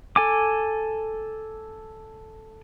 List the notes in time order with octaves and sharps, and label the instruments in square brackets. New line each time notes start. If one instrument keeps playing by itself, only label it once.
[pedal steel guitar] A4 G#5 D6